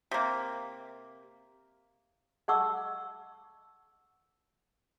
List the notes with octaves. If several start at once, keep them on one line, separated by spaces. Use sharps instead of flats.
C3 A#3
D#5 F#5 A5 C#6 D6 E6